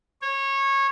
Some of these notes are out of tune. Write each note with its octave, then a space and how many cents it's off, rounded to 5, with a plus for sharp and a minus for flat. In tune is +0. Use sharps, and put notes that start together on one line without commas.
C#5 -20